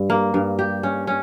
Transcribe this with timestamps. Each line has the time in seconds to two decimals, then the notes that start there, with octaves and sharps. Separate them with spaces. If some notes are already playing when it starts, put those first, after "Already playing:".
Already playing: G2
0.10 A#3
0.34 G2
0.59 G4
0.83 C#4
1.07 C#4